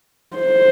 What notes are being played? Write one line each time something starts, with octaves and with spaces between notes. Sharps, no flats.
C5